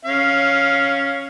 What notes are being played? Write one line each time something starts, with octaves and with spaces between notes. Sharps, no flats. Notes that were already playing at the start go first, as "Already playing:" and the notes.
C#4 F5